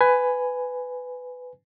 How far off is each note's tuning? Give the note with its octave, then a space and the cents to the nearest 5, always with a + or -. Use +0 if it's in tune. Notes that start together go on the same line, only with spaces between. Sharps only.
B4 +15 G#5 +0